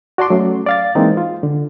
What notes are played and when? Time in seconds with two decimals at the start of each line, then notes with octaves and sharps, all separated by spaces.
0.18 F#4 D5 A5 C6 D6
0.30 F#3 A3 C#4
0.66 D5 F5 A6
0.95 E3 G#3 A#3 C4 D#4
1.17 F4
1.43 D3